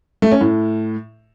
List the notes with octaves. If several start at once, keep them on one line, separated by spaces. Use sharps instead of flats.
A3
C#4
A2